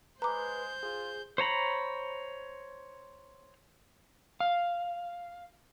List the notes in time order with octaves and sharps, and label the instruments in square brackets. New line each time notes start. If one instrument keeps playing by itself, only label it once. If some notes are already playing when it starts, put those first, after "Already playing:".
[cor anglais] G#3 [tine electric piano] B4 [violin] C5 G6 [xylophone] A#5 D6
[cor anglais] F4 [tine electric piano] G#4
[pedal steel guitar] C5 C#5 A#5 B5
[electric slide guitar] F5